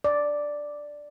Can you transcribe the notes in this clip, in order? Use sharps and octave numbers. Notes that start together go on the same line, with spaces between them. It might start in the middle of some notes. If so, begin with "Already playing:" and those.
D5